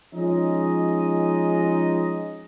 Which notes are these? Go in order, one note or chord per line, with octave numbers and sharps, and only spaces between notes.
F3 G#3 C#4 D#4 D#5